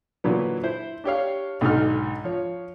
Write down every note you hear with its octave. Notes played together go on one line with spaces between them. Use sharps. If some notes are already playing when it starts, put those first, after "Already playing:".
A#2 D3 E3 F#3 B3
E4 C5
D4 G4 C#5 F5
B1 G#2 D3 D#4 F6
F3 C#5